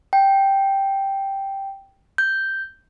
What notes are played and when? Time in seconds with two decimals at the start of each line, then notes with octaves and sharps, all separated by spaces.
0.13 G5
2.18 G6